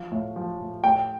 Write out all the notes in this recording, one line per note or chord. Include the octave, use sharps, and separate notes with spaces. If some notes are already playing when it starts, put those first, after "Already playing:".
Already playing: F3 F5
A2
F3
A2
A2 G5